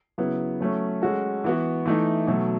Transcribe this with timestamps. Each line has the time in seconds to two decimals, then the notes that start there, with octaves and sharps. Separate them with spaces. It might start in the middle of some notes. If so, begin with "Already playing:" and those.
0.18 C#3 F#3 B3 E4
0.61 F#3 A3 C#4
1.02 G#3 C#4 F#4 A4
1.44 E3 B3 F#4
1.86 E3 A3 D#4
2.27 B2 F#3 A3